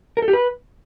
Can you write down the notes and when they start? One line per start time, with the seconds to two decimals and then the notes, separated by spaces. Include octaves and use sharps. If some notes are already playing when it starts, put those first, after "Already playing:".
0.17 A#4
0.22 A4
0.28 G4
0.33 B4